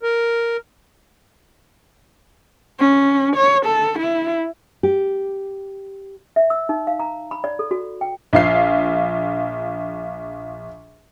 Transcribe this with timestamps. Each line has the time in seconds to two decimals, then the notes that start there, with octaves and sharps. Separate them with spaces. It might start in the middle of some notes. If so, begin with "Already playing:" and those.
0.03 A#4
2.79 C#4
3.36 C#5
3.66 A4
3.99 E4
4.83 G4
6.36 E5
6.50 E6
6.69 D#4
6.87 F5
7.00 A#5
7.31 B5
7.44 D5
7.59 A4
7.71 F#4
8.01 G5
8.33 A#1 F4 C7